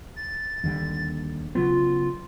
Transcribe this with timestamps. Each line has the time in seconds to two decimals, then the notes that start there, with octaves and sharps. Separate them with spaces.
0.16 A6
0.64 D#2 D3 G3
1.55 C#3 F#3 B3 F4